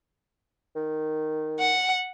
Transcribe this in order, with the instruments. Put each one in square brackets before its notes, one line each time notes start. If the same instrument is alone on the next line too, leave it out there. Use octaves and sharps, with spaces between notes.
[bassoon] D#3
[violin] F#5